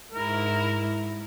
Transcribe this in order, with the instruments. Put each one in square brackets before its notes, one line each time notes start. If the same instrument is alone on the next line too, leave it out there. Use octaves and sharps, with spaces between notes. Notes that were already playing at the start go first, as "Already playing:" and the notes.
[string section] G#2 E4 [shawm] A#4